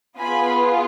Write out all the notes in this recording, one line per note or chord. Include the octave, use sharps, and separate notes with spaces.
B3 F4 G#4 G#5 B5